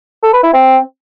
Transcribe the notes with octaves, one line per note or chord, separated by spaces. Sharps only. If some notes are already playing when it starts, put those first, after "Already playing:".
A4
B4
E4
C4